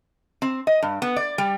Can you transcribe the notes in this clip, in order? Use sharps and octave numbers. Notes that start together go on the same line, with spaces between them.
C4
D#5
G2
B3
D5
G3